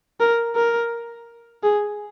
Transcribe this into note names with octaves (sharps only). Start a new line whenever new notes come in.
A#4
A#4
G#4